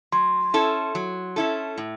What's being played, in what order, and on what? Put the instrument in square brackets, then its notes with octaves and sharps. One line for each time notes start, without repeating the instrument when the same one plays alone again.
[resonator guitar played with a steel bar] F#3 [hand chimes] C6
[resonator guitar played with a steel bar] C#4 E4 A4
F#3
C#4 E4 A4
A2